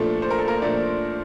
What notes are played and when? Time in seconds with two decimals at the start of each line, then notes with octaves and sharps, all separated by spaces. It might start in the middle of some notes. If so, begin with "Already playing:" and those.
Already playing: A#2 F3 A3 D4 A4
0.22 C5
0.30 A#4
0.39 A4
0.48 A#3 A#4
0.62 A#2 F3 A3 D4 D5